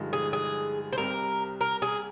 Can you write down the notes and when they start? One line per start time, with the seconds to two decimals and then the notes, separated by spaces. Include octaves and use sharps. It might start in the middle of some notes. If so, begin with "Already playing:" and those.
Already playing: G2 D3 F3 G#3 D#4
0.13 G#4
0.33 G#4
0.93 C5
0.97 C2 C3 G3 A#4
1.61 A#4
1.82 G#4